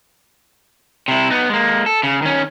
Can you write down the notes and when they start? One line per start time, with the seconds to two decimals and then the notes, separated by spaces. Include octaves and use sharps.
1.08 C3 E4
1.30 B3 D#4
1.49 G#3 A#3
1.86 A4
2.03 C#3
2.22 D#3 C#4